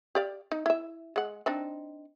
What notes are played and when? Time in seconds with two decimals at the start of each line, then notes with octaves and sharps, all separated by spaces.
0.15 G4 D5 F5
0.52 D#4
0.66 E4 E5
1.16 G#3 F#5
1.46 C4 D4 D#4